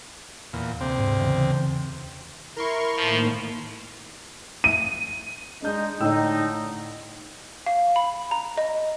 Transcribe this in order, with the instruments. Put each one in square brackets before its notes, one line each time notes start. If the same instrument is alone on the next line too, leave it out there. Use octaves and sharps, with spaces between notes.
[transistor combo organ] E2 A#2
D2 C3 C4
[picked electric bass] G#2
E2 C#3 E3
[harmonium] E4 [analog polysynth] A#4 C6 C#6
[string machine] A2 D#3 A#3 [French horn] F3
[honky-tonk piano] D#7
[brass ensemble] G#3 D#4 [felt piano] D4 G6
[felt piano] A2 G5 E6 [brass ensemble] D3 D#4
[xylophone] F5
B5
A#5
D#5